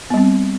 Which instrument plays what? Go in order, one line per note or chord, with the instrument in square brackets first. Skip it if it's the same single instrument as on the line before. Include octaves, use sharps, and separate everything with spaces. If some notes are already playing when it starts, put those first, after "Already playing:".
[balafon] B3
G3
C4